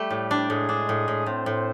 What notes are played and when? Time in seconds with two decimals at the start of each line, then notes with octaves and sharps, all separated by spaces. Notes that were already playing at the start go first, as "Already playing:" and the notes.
Already playing: G3 A3 G4
0.11 A2
0.31 D4
0.50 A2 G#3 G#4
0.69 D4
0.89 A2
1.08 A2
1.26 A2 C4 C5
1.46 A2